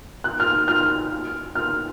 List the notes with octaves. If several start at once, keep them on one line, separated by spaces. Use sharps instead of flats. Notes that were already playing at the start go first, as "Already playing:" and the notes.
F#6
F6
F6
F6